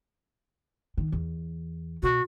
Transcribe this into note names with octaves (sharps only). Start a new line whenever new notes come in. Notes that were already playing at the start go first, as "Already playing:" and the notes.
D#3
E2
B2 F#4